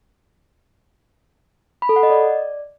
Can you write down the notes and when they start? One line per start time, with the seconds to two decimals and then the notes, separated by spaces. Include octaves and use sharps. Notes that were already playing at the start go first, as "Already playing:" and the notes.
1.82 B5
1.89 A4
1.96 F#5
2.03 D#5
2.10 D5